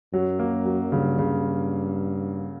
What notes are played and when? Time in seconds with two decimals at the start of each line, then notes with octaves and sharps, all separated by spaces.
0.13 F#2 F#3
0.39 A#3
0.65 F#3
0.92 G2 C#3
1.18 C#3